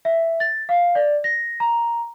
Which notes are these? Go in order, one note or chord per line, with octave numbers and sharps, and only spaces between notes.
E5
A6
F5
D5
A#6
A#5